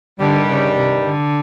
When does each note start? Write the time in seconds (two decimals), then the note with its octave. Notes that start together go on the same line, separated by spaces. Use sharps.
0.19 G2 D3 D#3 G3
0.48 C#3
0.76 C3
1.05 D3